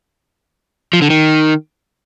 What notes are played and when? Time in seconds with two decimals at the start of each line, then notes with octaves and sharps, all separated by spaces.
0.93 F3
1.02 D3
1.10 D#3